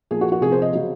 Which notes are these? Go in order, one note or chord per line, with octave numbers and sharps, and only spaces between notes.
A#2 F3 G#4
F#4
F#4
C3 F3 G#4
C5
D#5
C#3 F#3